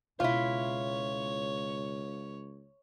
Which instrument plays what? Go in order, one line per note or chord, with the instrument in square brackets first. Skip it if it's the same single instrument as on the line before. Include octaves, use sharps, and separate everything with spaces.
[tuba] C#2 [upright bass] B2 [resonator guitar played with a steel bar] E4 F4 [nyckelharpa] C#5